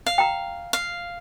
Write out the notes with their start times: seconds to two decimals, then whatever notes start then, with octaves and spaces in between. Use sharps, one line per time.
0.06 F5
0.18 G5 A#5
0.73 F5